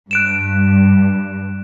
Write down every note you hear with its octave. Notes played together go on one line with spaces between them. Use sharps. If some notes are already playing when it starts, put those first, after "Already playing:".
G2 F#6 D7 E7